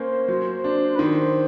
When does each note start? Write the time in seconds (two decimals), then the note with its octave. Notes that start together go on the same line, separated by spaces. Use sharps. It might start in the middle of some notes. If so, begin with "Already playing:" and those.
Already playing: A#3 C#4 C5
0.28 F#3
0.64 D4
0.96 B4
0.99 D#3 C5